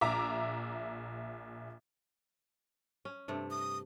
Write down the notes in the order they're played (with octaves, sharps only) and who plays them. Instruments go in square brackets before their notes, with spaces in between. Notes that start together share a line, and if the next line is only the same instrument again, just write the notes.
[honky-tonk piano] A#1 E5 A#5 D6
[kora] C#4
G2 C3 A3
[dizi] D#6